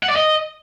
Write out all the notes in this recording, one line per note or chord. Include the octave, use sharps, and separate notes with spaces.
F#5
D5
D#5